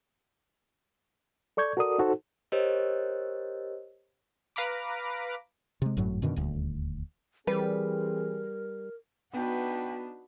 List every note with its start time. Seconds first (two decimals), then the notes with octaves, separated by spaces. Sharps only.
1.57 A4 D5 C#6 G6 G#6
1.77 F#4 A4 A#4 D5 D#6
1.99 D#4 F#4 A4 C5
2.52 G4 A#4 C5 C#5 D#5
4.56 B4 F5 A#5 B5 D6
5.82 C3 G#3
5.97 G#1 F#2 A2 F#3
6.22 F#2 B2 D3 D#3
6.36 D#1 D2
7.47 E3 G3 C4 G#4 A#4 B4
9.33 B3 D4 D#4 F#4 B4 G5